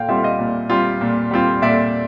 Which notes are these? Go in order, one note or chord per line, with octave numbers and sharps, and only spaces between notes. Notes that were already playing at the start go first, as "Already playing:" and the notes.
Already playing: A#2 F5 G5
G3 C4 F4 E5 F#5
D#5 F5
A#2
G3 C4 F4
A#2
G3 C4 F4
A#2 D5 E5